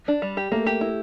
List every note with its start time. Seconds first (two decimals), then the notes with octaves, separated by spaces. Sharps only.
0.08 D4
0.22 G3
0.37 G4
0.52 A3 A#3
0.66 G4
0.81 E4